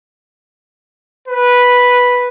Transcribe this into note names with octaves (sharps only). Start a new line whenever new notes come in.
B4